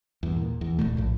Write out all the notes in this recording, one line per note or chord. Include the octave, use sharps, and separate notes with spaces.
E2 G2
A#2
E2
D#1 C#2 A#2 A3
A#1 A2